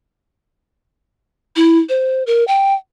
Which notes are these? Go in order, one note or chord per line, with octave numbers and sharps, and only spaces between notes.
E4
C5
A#4
G5